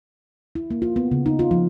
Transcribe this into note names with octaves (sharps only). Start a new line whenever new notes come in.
E4
A#3
F4
B3
C#3
D#4
F4
F3